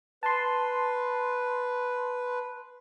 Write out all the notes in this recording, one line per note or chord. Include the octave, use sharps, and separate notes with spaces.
B4 A5 C6